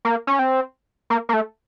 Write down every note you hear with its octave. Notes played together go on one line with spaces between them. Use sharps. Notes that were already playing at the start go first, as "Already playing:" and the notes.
A#3
C#4
C4
A#3
A#3
A3